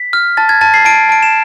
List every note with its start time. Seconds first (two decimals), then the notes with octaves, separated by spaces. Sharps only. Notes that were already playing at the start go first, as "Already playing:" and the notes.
Already playing: B6
0.13 F6
0.37 A5 A6
0.49 G#6
0.61 A5 A6
0.74 C7
0.85 A5 D7
1.09 A5 D7
1.23 E7